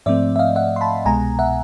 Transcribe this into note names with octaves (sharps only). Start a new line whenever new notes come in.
G#2 F3 A3 C4 D5 E5
E5
D#5 F5
E5 F#5
C6
A5 B5
C2 B2 G#3 B3 G#5 A#5
E5 F#5